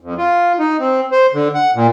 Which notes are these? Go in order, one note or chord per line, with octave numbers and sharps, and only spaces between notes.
F2
F4
D#4
C4
C5
D3
F#5
A#2